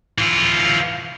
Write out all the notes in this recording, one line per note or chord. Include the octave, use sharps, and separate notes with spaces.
E3 F4